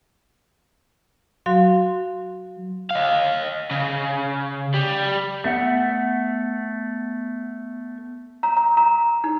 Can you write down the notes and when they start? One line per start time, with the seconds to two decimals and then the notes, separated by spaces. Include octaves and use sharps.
1.46 F#3 F#4 F5 C6
2.91 D#5 F5
3.71 C#3
4.74 G3
5.44 A3 B3 E5 F#5
8.43 A#5
8.57 A#5
8.77 A#5
9.24 D#4